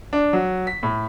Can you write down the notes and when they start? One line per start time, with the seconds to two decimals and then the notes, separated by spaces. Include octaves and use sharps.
0.13 D4
0.33 F#3
0.67 B6
0.83 A2